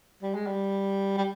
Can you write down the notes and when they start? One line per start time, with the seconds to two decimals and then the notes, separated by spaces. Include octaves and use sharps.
0.23 G3
0.35 G#3
0.47 G3
1.18 G3